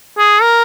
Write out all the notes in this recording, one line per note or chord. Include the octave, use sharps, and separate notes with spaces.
G#4
A#4